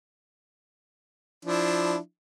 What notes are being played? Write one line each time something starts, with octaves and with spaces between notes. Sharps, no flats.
F3 D4 E4